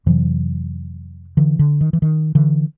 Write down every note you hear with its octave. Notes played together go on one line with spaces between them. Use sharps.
F2 C3 E3 F#3
D3 E3
D3
D#3
E3
D#3
D3 E3